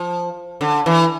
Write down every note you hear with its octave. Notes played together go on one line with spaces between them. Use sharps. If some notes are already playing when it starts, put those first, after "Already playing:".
Already playing: F3
D3
E3